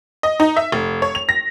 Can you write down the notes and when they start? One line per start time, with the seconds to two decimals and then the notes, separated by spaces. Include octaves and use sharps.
0.23 D#5
0.40 D#4
0.57 E5
0.72 F1
1.02 C#5
1.15 F7
1.29 A#6